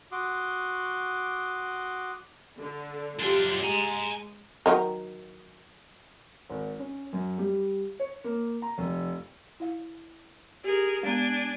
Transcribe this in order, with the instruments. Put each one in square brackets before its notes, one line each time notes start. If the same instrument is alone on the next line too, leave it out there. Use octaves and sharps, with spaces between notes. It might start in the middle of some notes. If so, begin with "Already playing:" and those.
[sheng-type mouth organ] F#4 C6 D6 D#6
[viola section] D3
[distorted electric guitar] F#2 D4 [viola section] F4 G4
[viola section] G#3 [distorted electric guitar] G#5 A#5
[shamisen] D#3 F#3 A#4
[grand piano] G#1
C#4
F#2
G3
C#5
A#3
A#5
F1
[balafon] E4 F5
[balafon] G4 [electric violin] G#4 A#4
[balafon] G#3 B3 [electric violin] D4 G#5